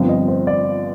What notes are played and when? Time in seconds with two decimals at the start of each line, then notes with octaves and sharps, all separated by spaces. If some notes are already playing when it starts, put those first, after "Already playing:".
Already playing: G1 G2 F3 C4
0.09 D#5
0.28 C5
0.47 D5